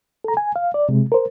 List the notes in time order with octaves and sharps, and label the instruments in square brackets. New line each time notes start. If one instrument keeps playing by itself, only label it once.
[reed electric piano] A4 A#5
G#5
F5
D5
C3 G#3
A#4 C5